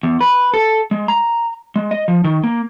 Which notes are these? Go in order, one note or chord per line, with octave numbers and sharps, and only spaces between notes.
E2
B4
A4
G#3
A#5
G#3
D#5
F3
D#3
A#3